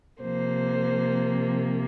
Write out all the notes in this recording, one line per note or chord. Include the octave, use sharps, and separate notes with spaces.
C3 F3 A#3 C5